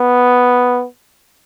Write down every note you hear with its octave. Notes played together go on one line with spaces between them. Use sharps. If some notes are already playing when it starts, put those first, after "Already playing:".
Already playing: B3